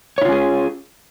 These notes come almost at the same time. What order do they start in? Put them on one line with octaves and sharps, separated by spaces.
C#5 E4 F4 C#4 G#4